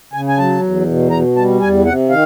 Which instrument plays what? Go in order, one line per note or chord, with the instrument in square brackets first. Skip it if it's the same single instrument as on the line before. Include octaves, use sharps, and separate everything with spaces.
[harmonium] C#3 G#5
G#5
F#3 A5
E2
B2
B2 A#5
G3 A5
E2 G#5
C3 F#5
D#3 F5